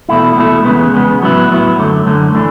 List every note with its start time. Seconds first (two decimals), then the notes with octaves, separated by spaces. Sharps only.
0.09 E2 B2 A3 E4
0.36 E2 B2 A3 E4
0.65 E2 C#3 G#3 B3
0.93 E2 C#3 G#3 B3
1.22 A2 F#3 B3 E4
1.50 A2 F#3 B3 E4
1.78 F#2 D3 A3
2.06 F#2 D3 A3
2.35 E3 A3 D4